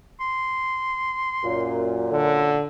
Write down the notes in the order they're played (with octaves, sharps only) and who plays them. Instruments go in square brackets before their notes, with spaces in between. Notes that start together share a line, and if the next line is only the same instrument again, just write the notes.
[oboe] C6
[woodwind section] F#2 A#2
[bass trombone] D3